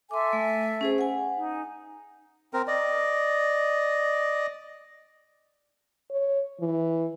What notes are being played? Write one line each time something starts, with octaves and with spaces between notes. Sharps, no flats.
A4 E5 G#5 C6 D6
A3
C#4 G#4 C5
F#5 G#5
D#4
C4 A#4
D5 D#5
C#5
E3